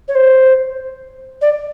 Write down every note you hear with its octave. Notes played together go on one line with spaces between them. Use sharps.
C#5
C5
D5